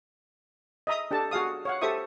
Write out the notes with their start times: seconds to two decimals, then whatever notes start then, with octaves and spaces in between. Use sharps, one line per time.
0.87 D#5 E5 A#5 D#6
1.11 D4 G4 A4 A5
1.31 F#4 G#4 F5 D#6
1.65 C#5 F5 F#5
1.82 G4 A4 C5 E5 C#6 D#6